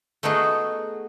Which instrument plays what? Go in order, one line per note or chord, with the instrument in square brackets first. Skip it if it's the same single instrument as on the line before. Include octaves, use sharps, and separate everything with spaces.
[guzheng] A3 B3 D#4 F#4 G#4